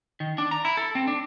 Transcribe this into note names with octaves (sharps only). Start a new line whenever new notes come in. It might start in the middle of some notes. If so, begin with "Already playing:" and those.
D#3
D4
A#5
E4
A4
C4
D4